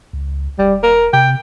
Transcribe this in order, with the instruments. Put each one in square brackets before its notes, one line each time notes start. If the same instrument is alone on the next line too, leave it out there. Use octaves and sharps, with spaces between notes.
[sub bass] C#2
[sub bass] E1 [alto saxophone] G3
[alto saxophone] A#4
[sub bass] C3 [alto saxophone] G5